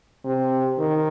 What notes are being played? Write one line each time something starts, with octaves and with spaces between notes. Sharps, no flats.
C3
D#3